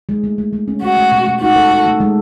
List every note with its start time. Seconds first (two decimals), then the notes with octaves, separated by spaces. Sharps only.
0.09 G#3
0.24 A3
0.38 A3
0.53 A3
0.68 C#4
0.82 A3 F#4
0.97 A3
1.12 B2
1.27 A3
1.41 D#4 F#4
1.56 A4
1.71 A4
1.86 A3
2.00 G#3